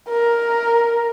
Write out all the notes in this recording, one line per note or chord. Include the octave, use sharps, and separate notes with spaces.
A#4